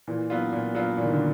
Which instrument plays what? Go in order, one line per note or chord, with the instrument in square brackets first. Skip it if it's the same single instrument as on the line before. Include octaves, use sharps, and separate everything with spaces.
[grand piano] A#2 [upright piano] E3
[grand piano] F#3 B3 D4 F4
A#2
F#3 B3 D4 F4
[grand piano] A#2 [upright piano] E3
[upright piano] D#3
D3